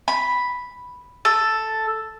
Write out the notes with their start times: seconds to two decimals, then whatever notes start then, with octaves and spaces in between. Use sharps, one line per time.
0.08 B5
1.25 A4